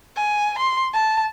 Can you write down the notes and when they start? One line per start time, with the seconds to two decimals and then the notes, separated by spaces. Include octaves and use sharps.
0.16 G#5
0.59 C6
0.93 A5